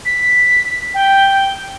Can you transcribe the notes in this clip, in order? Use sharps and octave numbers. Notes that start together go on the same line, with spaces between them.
B6
G5